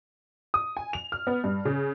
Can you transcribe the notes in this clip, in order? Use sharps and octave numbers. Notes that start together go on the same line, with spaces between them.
D#6
G#5
F7
F6
B3
G2
C#3